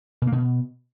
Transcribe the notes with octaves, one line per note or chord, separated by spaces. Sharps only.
B2
A#3
B2